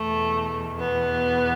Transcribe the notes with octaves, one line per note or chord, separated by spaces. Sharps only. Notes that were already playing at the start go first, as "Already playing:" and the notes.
Already playing: E2 B2 A3
B3